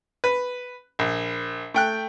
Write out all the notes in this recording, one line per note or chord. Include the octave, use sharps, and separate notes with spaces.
B4
A#1
A3 G5 F#6